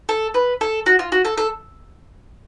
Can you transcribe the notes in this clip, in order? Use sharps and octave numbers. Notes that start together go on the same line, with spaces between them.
A4
B4
A4
F#4
F4
F#4
A4
A4